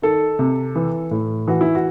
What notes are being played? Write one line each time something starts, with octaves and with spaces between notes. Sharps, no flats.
D#3 A4
C3
E3
A2
E3 F#4
E4
F#4